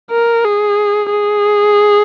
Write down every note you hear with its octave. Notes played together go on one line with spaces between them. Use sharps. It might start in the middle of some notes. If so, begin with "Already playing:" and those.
A#4
G#4
G#4